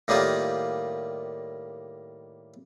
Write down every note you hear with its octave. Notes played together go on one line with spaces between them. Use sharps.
A2 D#3 G3 A#3 D#4 F4